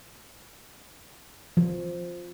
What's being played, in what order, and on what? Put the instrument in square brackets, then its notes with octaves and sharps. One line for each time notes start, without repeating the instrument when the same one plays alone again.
[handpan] F3